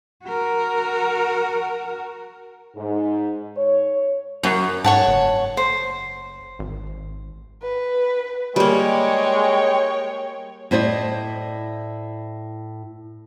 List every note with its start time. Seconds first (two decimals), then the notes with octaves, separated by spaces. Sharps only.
0.25 F#4 A#4
2.75 G#2
3.56 C#5
4.43 F#2
4.84 G#2 C#5 F#5 A5
5.07 F#1
5.57 C5
6.59 G#1
7.63 B4
8.56 G3 G#3 A#3 C#5 G5
10.71 A2 E4 C5 D5 D#5